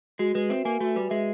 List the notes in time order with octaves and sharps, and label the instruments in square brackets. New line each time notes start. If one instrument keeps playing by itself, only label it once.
[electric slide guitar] G#3 [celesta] F#4
[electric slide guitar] G#3 [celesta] B4
[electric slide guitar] C4 [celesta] E5
[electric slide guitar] A#3 [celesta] G#5
[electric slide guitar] A3 [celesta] F#4
[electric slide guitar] G3 [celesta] B4
[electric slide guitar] G#3 [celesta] E5